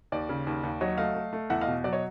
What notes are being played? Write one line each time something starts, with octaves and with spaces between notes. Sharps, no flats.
D#2 D5
C#3
D#2
D#2
F#3 C#5 D#5
A3 D#5 F5
A3
A3
E2 E5 F#5
D#5 F5
B2
F#3 D5
C#5 D#5